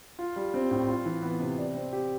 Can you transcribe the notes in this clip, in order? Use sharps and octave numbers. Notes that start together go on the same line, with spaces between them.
F4
G3
C4
A2
F4
E3
B3
C3
D5
C4
G4